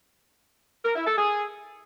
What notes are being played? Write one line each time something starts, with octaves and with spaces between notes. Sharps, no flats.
A#4
E4
A4
G#4